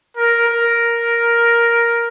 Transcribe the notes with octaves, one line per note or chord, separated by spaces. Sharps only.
A#4
A#4